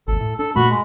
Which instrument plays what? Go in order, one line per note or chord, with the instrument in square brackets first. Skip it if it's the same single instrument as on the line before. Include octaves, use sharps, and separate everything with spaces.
[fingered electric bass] G#1 D#2 [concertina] A4
[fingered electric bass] A2
[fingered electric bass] D4 [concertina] A4
[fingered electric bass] G2 A#2 A3 [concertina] F#4 B5
[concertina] G#3